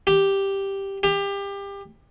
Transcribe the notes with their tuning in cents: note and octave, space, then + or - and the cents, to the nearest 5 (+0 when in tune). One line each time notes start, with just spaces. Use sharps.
G4 +0
G4 +25